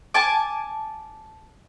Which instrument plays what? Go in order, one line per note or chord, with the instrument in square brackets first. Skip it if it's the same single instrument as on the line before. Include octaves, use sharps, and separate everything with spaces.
[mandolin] G#5 A5 D6